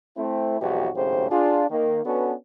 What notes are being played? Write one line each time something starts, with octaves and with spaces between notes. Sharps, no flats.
A3 C4 E4
B1 F2 G#2 E3 F#4 G4
G#1 F#2 A2 C#3 G4 C5
D4 F4 G#4
D#3 A#3
B3 C#4 D4 F#4 A4 B4